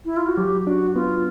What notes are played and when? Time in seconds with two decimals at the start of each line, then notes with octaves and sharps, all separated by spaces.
0.05 E4
0.17 F4
0.28 F#4
0.37 F#3 G4
0.67 D4 F#4
0.95 B3 F4